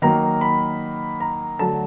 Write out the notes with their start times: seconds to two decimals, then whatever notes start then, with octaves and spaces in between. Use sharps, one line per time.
0.02 D#3 F#3 A#3 A#5
0.41 B5
1.20 A#5
1.59 D3 F#3 A3 A5